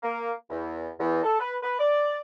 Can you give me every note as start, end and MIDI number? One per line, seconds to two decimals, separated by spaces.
0.03 0.32 58
0.50 0.91 40
1.00 1.22 40
1.24 1.38 69
1.40 1.56 71
1.63 1.78 71
1.79 2.19 74